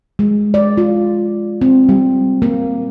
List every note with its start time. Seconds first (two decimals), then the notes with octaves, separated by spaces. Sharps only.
0.19 G#3
0.54 D5
0.77 F4
1.61 C4
1.89 G3
2.42 A#3